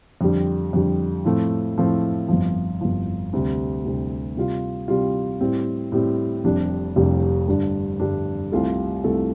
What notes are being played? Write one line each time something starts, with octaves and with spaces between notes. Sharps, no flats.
F2 D3 G3
F2 D3 G3
A2 F3 A3 C4
A2 F3 A3 C4
G1 F2 F3
G1 F2 F3
D2 C3 G3
D2 C3 G3
C3 G3 F4
C3 G3 F4
A2 G3 C4
A2 G3 C4
F1 F2 C3 G3 D4
F1 F2 C3 G3 D4
G2 D3 G3 D4
G2 D3 G3 D4
C2 C3 A3 F4 A4
C2 C3 A3 F4 A4